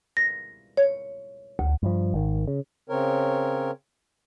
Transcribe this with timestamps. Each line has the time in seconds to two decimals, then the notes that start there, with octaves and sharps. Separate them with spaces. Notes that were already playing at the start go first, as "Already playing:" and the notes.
0.17 A#6
0.77 C#5
1.59 D2
1.83 G2 F3
2.14 G#1 D#3
2.47 C#3
2.89 C#3 C4 A#4 C#5